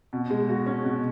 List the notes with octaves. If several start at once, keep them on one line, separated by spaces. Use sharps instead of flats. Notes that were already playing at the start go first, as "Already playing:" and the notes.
B2
G#3
F#4
C#4
B2